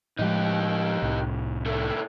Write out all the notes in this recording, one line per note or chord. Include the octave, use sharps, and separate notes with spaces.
A2 F3 G#3 D#4 G4
C2 A2
A#2 A3